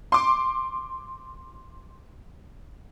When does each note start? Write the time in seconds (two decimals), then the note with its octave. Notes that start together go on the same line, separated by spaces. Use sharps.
0.12 C6 D6